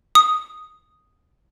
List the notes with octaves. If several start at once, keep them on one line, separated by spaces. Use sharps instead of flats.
D#6